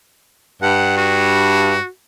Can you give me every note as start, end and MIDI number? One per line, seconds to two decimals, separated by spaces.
0.62 1.76 43
0.62 0.94 78
0.97 1.88 66